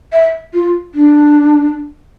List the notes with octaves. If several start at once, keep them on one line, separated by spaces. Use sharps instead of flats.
E5
F4
D4